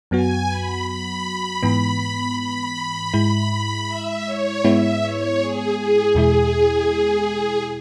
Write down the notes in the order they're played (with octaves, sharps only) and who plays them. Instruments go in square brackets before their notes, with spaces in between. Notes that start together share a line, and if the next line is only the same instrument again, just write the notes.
[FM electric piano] F#2 F#3 B3 F#4 [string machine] G#5
[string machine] B5
B5
[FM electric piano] G#2 E3 B3
[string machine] B5
[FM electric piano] G#2 G#3 E4
[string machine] E5
C#5
[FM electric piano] G#2 G#3 B3 E4 [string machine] E5
[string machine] C#5
G#4
G#4
[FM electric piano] E2 B2 G#3 E4 [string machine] G#4